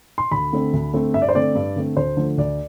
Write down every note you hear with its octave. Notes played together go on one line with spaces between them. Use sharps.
C6
D2 B5
D3 A3 C4
D2
D3 A3 C4
G2 E5
D5
C5
D3 A3 C4 D5
G2
D3 A3 C4
D2 C5
D3 F3 A3
D2 D5